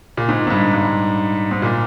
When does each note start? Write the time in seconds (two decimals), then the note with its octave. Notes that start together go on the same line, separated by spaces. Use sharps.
0.17 A#2
0.29 G#2
0.47 G#2
0.50 G2
0.73 G2
1.51 G#2
1.62 A#2